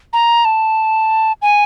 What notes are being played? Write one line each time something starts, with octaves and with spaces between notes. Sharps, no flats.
A#5
A5
G#5